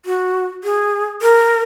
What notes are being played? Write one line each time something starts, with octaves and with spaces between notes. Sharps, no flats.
F#4
G#4
A#4